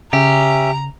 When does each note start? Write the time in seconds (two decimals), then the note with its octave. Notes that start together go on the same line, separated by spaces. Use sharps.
0.13 C#3 C#4 G4 E5 A#5